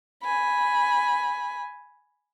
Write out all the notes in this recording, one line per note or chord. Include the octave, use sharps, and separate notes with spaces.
G#5 B5